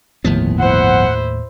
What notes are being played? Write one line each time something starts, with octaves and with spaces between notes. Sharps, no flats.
G1 D#2 A2 F3 B3
E4 C5 F#5